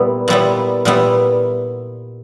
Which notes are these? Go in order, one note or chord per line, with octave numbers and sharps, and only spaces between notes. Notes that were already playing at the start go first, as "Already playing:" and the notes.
Already playing: A#2 G3 B3 E4
A#2 G3 B3 E4
A#2 G3 B3 E4